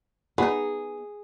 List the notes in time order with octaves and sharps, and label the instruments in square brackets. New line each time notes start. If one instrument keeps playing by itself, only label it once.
[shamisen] B3 D#4 [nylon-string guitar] G#4